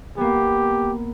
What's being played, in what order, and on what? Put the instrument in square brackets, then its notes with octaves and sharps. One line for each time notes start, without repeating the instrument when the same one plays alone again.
[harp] A#3 B3 [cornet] G4